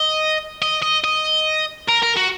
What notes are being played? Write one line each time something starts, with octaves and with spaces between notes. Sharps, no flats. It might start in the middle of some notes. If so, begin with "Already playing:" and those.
Already playing: D#5
D#5
D#5
D#5
A#4
A#4
F#4